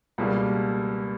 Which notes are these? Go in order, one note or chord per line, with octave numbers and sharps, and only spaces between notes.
C#2 B2 G3 A#3